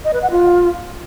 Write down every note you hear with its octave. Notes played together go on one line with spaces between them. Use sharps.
D#5
B4
F#5
F4